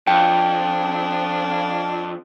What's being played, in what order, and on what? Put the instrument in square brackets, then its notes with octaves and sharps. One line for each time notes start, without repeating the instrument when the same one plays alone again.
[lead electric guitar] F2 [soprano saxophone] D4 [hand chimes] G5